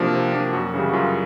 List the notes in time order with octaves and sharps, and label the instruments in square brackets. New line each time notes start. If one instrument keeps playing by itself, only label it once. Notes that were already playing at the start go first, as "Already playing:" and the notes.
Already playing: [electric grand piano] C3 F3 A#3 D4 F#4
C3
F3 A#3 D4
F#2 F#4
C#3 E3 G3
F#4
F#2 F4